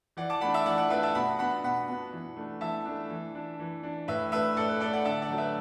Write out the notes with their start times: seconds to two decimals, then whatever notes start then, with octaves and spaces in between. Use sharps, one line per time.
0.17 E3 D5 F#5
0.30 A5 D6
0.41 A3 D4 F#5 B5
0.54 E5 A5
0.66 E3 D5 F#5
0.78 D5 F#5
0.90 A3 D4 B4 E5
1.03 E5 A5
1.15 B2 F#5 B5
1.39 B3 D4 F#5 B5
1.63 B2 F#5 B5
1.88 B3 D4
2.13 E3
2.37 A3 D4
2.61 E3 E5 A5
2.85 A3 D4
3.10 E3
3.35 D4
3.59 E3
3.83 D4
4.08 A2 B4 E5
4.32 A3 D4 B4 E5
4.57 A2 A4 D5
4.68 B4
4.81 A3 D4 A4 D5
4.93 D5 F#5
5.05 D3 E5 A5
5.22 D5 F#5
5.30 F#3 A3 D4
5.38 B4 E5